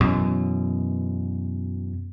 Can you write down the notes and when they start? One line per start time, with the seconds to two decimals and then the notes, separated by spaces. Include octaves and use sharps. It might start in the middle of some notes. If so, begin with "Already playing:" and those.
0.01 F#2 B2 E3